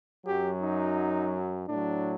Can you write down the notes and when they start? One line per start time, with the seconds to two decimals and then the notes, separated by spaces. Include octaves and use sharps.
0.25 F#2 F#3 G4
0.61 D#4
1.68 A2 F#3 D4